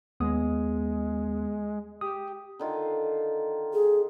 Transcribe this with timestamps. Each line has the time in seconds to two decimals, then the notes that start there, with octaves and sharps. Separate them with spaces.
0.20 D#2 G#3 B3 D#6
2.01 G4 D#6
2.59 D3 D#3 F4
3.74 G#4